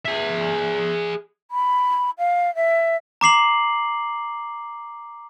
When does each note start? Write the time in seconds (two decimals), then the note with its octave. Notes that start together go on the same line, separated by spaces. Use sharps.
0.06 G#4 E5
1.51 B5
2.18 F5
2.55 E5
3.21 A#5 D6 C7 F#7